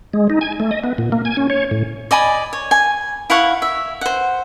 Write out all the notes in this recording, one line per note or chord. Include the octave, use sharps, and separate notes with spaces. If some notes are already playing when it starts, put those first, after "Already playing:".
G#3
D#4
G#5
A3
D#5
B3
A#2
A#3
G#5
C#4
C#5
A2
D5 D#5 G#5 B5
C#5
G#5
E4 F5 F#5 C#6
E5
C5 F#5